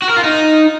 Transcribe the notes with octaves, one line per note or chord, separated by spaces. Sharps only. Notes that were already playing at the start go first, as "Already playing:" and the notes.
F#4
A#4
F4
D#4